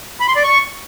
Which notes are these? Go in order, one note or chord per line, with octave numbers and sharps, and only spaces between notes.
B5
C6
D5
C#6